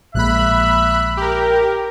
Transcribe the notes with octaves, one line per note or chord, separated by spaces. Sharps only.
A#1 G#3 A#3 E5 B5 F#6
G4 A#4